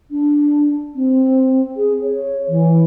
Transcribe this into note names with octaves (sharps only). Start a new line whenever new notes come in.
D4
C4
G#4
C#5
E3